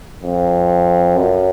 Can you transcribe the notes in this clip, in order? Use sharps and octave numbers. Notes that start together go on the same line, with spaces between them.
F2
F#2